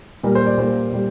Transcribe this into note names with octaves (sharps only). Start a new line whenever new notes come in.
A#2 G3 A#3 A#4
C5
D5
A#2 G3 A#3 C5
A#2 G3